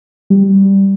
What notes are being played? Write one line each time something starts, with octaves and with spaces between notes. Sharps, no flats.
G3